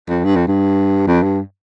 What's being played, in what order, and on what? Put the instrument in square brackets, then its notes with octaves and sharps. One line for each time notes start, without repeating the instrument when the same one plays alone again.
[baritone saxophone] F2
G2
F2
G2
F2
G2